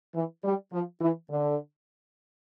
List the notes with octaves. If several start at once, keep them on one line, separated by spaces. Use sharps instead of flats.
E3
G3
F3
E3
D3